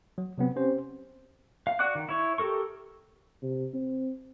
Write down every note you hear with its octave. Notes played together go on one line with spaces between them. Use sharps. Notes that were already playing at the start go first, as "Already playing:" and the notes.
F#3
C3 F#3 B3 C4
C4 C#4 G4 C5
F5
F#4 D5 F#5 D6 F#6
D#3
E4 C#5
G4 A4 A#4 C#6
C3
C4